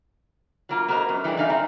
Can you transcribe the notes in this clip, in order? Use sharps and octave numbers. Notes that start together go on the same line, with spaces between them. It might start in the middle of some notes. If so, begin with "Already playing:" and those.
F#3 A#3 F4
A#3 B3 F#4 A#4 C5 D#5
F#2
E3 G3 G#3 D4
F#2 A3 D#4 G#4 F5
C4 D#4